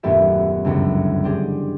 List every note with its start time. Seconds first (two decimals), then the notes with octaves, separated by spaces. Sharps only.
0.03 D#1 F#2 A3 B3 G4 E5
0.64 G1 C#2 F#2 E3
1.24 C4 D4 G4 G#4